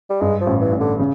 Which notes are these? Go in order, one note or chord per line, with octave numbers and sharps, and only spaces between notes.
G3
G2 G#3
F3
A1
E3
A1
D3
C#3